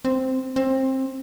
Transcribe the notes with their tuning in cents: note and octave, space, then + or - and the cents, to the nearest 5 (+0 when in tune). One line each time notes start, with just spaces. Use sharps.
C4 -5
C4 +20